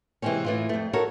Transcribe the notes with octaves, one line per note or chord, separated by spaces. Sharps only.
C3 E3 F#3 G#3 C4 C#4
A2 E3 F4
F2 A3
F#4 A4 A#4 C#5